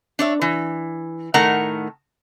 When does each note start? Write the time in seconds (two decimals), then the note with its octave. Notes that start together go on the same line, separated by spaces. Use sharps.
0.19 D4 C#5 E5
0.42 E3
1.34 A2 D#3 A3 A#4 F#5 A#5